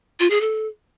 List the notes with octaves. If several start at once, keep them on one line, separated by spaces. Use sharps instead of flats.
F4
G#4
A4